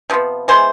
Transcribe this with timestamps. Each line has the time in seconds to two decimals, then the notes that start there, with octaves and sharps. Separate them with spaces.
0.10 C3 F3 B3
0.48 E3 G#3 B3 C5